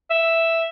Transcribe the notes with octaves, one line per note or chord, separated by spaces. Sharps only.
E5